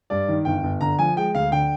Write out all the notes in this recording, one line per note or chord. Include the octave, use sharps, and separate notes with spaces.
G2 D5
D#3
G1 G5
G1
D3 A#5
F3 G#5
G#3 G5
D2 F5
D3 G5